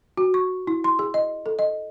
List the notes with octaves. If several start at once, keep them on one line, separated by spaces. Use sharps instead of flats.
F#4
C#6
E4
C6
G#4
D#5
A4
D#5